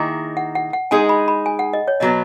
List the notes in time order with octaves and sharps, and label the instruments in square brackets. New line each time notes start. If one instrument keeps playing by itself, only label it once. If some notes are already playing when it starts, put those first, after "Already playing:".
Already playing: [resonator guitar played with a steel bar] D#3 A#3 E4 G#4
[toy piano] F#5
F#5
F#5
[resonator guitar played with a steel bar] G#3 D#4 G#4 [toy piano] G#5
[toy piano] B5
B5
G#5
F#5
D#5
C#5
[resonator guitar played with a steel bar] B2 F#3 B3 [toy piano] D#5